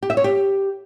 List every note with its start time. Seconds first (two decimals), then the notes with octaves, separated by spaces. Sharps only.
0.03 G4
0.10 E5
0.17 C#5
0.24 G4